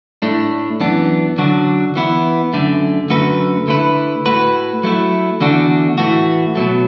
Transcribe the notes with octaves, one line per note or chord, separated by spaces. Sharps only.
A2 A3 D4
F#2 E3 B3 D4
F#2 D3 F#3 D4 F#4
E3 B3 E4
F#2 D3 A3
F#2 D3 A3 F#4 B4
D3 A3 E4 B4
A2 A3 F#4 B4
F#3 A3 E4
E2 D3 A3 D4 F#4
A2 E3 A3 F#4
B2 F#3 A3